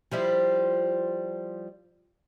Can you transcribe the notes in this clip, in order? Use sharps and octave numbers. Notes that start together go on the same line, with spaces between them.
F3 G3 E4